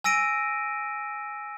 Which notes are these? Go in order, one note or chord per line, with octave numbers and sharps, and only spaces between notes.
G#5 E6 A#6 D7 D#7